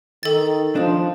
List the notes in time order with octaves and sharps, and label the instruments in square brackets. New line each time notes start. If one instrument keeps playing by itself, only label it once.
[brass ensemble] D#3 [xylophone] A4 A6
[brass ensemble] F3 [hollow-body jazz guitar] D4 D#4